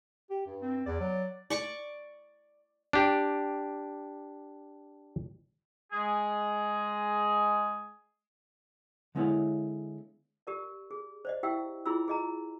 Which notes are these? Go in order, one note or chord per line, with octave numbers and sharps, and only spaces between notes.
G4
G2
C4
E2 D5
F#3
D5 C#6 D6
D4 G4
G#3 G#4
D3 G#3 B3 E4 C#5 F5
G4 A#4 D5
G#4
C5 D5 D#5
E4 G4 E5 F5 G5 E6
E4 F4 G#4 B5 E6
G#4 D#5 A#5